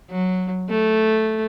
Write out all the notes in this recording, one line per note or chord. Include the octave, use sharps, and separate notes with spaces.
F#3
A3